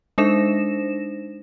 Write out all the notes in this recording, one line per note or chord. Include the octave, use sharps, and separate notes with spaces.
G#3 D4 D#4 C5 A#6 E7